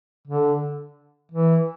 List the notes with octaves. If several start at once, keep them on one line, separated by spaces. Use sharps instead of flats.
D3
E3